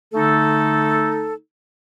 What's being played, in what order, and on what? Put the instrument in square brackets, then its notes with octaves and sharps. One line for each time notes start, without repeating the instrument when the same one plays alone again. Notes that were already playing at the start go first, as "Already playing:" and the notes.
[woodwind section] D3 A3 D#4 A4